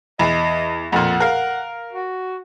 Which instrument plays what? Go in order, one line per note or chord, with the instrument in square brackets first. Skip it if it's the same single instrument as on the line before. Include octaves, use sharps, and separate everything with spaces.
[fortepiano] E2 [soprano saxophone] D#5
[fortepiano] F2 A#2 [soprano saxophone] F#5
[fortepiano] A#4 F5
[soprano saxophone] F#4